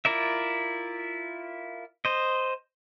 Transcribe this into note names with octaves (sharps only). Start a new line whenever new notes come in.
E4 F4 A#4 D5 E5
C5 D#5